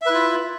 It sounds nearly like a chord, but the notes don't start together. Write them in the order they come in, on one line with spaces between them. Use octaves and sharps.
E5 B4 E4 F4